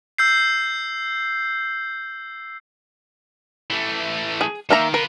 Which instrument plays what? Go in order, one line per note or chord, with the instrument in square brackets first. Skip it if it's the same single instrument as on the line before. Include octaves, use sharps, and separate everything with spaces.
[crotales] E6 G6 C7
[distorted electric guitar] E3 A3
[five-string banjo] G#4
[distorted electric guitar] D#3 [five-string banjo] A#3 E5 A#5
[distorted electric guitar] F4 B4 [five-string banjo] A#4